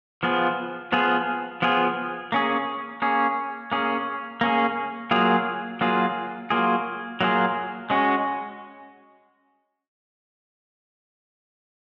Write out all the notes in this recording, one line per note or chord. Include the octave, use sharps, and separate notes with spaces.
F3 B3 F4 G#4
F3 B3 F4 G#4
F3 B3 F4 G#4
A#3 C#4 G#4
A#3 C#4 G#4
A#3 C#4 G#4
A#3 C#4 G#4
F#3 A#3 F4 G#4
F#3 A#3 F4 G#4
F#3 A#3 F4 G#4
F#3 A#3 F4 G#4
G#3 C#4 F#4